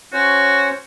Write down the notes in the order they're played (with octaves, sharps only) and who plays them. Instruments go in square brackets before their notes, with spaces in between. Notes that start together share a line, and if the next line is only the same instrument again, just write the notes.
[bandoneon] C#4 C5 C#5 [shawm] F#4